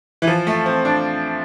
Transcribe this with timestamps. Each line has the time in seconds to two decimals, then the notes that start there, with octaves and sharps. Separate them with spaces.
0.22 E3
0.27 F3
0.47 A3
0.66 C4
0.85 D4